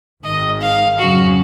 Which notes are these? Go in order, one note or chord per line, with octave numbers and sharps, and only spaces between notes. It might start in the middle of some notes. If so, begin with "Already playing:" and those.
G#1 G#2 D#3 G#3 D#5
F5
F2 C#3 F#3 C#4 F#4